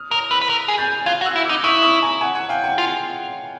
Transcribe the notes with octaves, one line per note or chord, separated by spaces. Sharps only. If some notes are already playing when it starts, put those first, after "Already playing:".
Already playing: D#6 F6
A#4 D#6 F6
B4 E6 F#6
B4
A#4
G#4
G6 A6
F4 F#6 G#6
F#4
E6 F#6
E4
D#4 D6 E6
E4 C#6 D#6
C#6 D#6
G#5 A#5
F#5 G#5
F#5 G#5
F5 G5
F#5 G#5
F4